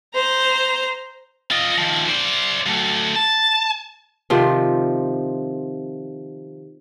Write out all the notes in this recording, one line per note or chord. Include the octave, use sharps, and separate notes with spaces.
C5 A#5
F4 D#5
D#3 F3
C5 D5
F#3 A3
A5
C3 D#3 F3